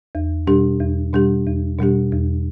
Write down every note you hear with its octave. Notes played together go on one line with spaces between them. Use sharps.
E2
B2 G3 D4 G4
E2
B2 G3 D4 G4
E2
B2 G3 D4 G4
E2